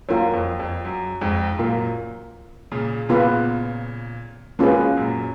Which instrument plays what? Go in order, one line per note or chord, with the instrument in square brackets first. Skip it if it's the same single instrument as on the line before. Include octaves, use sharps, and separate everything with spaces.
[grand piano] F#2 [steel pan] A#3 F4 A#4 C#5
[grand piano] F2
F2
F#2
F2 G#2
[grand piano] F#2 A#2 [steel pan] A#3 F4 A#4
[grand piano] A#2 C#3
[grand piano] A#2 C#3 [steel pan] B3 F4 B4
[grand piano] G#2 B2 [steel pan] A#3 C#4 F4 G#4 B4
[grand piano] F#2 A#2